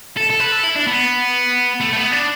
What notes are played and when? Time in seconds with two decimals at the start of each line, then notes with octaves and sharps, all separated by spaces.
0.17 A4
0.30 A4
0.40 B4
0.52 A4
0.63 E4
0.76 D4
0.87 B3
1.81 A3
1.93 A3
1.96 B3
2.12 D4